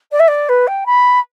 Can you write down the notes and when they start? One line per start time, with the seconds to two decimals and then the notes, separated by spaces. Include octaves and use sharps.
0.12 D5
0.19 E5
0.28 D5
0.49 B4
0.67 G5
0.86 B5